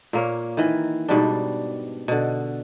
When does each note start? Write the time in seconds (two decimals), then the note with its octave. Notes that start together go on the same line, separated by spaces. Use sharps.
0.13 A#2 A#3 C#5
0.57 D#3 E3
1.09 G#2 B2 G3 D4
2.08 B2 D3